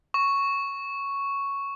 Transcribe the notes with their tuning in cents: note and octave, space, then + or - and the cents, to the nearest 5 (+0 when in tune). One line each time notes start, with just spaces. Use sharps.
C#6 +0